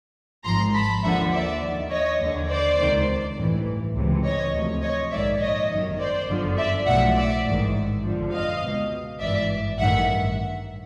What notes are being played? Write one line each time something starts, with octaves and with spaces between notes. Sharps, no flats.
G#1 G#2 F3 A#5 C6
A5 B5
D#2 D3 F3 E5 F#5
D5 E5
D#2 D#3
C#5 D#5
D#2 D3 F3
C5 D5
C#2 C3 D#3
A1 G2 E3
C#2 C3 E3
C#5 D#5
D2 C3 F3
C#5 D#5
A#1 G#2 D#3 D5 E5
C#5 D#5
G1 F#2 D#3
C5 D5
G1 F#2 D3 F3
D5 E5
B1 A2 F3 E5 F#5
D5 E5
A1 G#2 D#3
G1 F2 D3 F3
D#5 F5
C#2 B2
G#1 G2 E3 D5 E5
A1 G2 D#3 E5 F#5